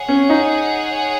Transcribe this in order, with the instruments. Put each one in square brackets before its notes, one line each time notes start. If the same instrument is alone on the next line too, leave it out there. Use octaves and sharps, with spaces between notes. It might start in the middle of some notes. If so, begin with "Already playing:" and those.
Already playing: [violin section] G#4 C#5 F#5
[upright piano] C#4
D#4